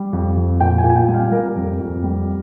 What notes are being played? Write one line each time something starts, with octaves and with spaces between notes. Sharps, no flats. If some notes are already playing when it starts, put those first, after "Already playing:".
Already playing: G3
F2
F2
A#2 G5
G#5
A#2
G#5
G5
G3
F5
G3 A#4
F2
F2
G3